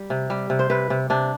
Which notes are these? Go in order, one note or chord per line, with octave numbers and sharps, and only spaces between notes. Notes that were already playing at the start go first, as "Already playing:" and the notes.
Already playing: G3
C3
G3
C3
C5
C3 B4
C3
C3 D4